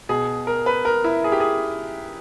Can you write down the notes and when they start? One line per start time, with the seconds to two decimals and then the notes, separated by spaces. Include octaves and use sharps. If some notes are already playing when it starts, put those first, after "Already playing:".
0.09 B2 G#4
0.47 A#4
0.66 B4
0.85 A#4
1.04 E4
1.24 G#4
1.32 G4
1.40 G#4